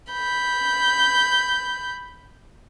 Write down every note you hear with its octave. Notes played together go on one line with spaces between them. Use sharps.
B5 G6